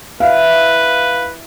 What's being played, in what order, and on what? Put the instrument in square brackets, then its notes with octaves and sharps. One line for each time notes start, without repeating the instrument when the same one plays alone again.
[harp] E4 E5 [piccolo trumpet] B4 [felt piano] F5